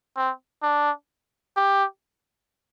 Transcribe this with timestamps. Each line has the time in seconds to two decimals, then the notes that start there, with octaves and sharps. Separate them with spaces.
0.17 C4
0.63 D4
1.56 G4